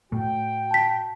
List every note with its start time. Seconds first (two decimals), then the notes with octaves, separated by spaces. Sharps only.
0.12 A2 A3 F#4 G5
0.71 A5 B6